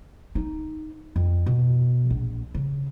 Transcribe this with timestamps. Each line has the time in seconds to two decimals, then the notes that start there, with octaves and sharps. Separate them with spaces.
0.35 D#4
1.16 F2
1.46 B2
2.10 A#1
2.55 C#3